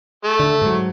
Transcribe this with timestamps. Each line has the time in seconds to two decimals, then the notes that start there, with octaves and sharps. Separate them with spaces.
0.24 A3
0.40 D3
0.62 G#2 F#3